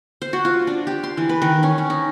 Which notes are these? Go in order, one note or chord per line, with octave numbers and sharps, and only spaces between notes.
C5
F#4
F4
D4
G4
C6
E3
B4
D#3
C#4
C#4
D#4